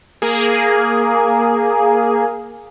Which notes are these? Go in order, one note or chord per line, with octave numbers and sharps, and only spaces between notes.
A#3 G#4